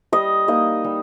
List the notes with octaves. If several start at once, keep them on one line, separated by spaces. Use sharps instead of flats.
G3 D#5
A#3 D#4 D#5
G3